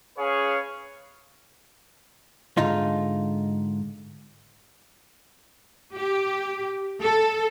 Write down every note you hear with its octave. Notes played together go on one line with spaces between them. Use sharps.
C#4 G#4 B4 C#5 F5
G#2 D3 D#4 F4
G4
A4